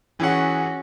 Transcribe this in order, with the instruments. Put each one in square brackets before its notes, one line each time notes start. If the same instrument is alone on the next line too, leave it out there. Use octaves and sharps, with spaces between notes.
[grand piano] E3 G#4 F#5 [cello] C#4 F#4